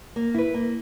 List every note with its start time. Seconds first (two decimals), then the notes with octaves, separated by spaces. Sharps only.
0.16 A#3
0.34 E4 B4
0.54 A#3